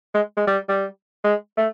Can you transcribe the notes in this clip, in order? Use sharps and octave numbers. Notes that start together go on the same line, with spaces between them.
G#3
G#3
G3
G3
G#3
A3